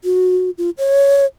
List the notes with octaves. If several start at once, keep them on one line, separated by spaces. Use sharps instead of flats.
F#4
F4
C#5